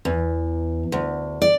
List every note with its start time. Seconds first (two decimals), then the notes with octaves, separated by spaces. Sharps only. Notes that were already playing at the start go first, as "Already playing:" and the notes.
0.05 E2
0.92 D2
1.42 D5